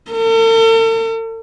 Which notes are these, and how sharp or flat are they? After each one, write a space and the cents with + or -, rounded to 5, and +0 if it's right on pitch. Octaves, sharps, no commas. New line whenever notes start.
A4 +45